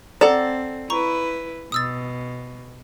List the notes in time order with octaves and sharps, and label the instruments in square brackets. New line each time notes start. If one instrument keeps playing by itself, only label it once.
[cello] C4 [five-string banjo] A4 D5 [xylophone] F#5 A#5 E7
[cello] E4 B4 [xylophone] A#5 C#6
[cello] B2 [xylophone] D#6 E6 A6